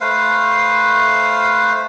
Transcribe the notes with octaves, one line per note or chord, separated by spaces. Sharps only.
A3 B4 C5 F5